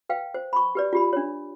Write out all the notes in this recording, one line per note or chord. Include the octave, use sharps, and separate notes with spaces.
B4 F5 G5
C5
B5 C#6
G4 B4 D5
F4 G4 B5
D4 C#5